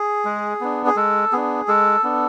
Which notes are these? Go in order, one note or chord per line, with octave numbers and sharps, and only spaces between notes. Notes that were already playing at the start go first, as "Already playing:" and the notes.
Already playing: G#4
G#3
B3 D4
G#4
G#3 A4
B3 D4 G#4
G#3 A4
B3 D4